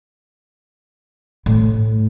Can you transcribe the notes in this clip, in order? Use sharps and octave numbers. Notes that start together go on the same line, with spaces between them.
A2